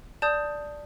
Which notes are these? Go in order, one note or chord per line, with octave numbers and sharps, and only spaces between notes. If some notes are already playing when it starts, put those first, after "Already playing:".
D5 A5 D#6 G6